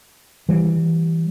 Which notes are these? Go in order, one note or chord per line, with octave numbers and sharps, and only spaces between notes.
E3 G3